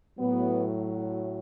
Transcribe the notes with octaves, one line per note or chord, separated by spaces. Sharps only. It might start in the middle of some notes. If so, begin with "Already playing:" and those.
A2 F#3 B3